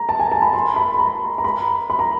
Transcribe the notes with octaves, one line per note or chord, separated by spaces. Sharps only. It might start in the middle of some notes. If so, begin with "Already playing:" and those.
Already playing: A#5
A5
G#5
A5
B5
C6
B5
B5
A#5
A#5
B5
B5
A#5